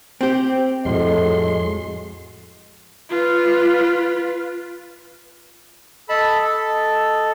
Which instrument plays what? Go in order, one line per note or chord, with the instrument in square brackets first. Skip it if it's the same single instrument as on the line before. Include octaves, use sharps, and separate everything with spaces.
[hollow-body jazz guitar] C4 G4
[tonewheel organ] F2 G#3 C6 [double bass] A2 [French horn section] F#4 D#5
[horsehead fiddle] F4 B4
[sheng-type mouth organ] A4 A5 B5 [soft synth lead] D#5
[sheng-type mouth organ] A4